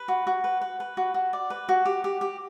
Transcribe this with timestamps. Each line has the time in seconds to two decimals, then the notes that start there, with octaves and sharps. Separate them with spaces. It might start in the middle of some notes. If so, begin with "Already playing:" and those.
Already playing: B4 B5
0.08 F#4
0.27 F#4
0.44 B4
0.61 B4
0.80 B4
0.97 F#4
1.14 F#4
1.33 D5
1.50 B4
1.69 F#4
1.85 G4
2.04 G4
2.21 G4